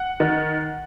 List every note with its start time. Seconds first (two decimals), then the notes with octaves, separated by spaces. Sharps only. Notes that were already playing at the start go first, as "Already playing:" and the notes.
Already playing: F#5
0.20 D#3